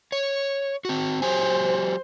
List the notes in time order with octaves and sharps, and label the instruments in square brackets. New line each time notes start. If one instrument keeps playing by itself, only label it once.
[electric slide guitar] C#5
C4 F#4
[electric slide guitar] F#3 G4 G#5 [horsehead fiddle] C5